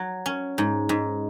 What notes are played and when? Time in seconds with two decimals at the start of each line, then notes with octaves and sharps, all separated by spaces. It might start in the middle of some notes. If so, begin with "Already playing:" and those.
Already playing: F#3
0.26 C#4
0.58 G#2
0.89 G#2